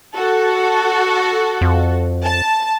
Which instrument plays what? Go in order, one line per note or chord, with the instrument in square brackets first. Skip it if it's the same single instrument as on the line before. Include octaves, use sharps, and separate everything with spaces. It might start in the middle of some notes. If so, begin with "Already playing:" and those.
[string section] F#4 A4
[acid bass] F2
[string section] A5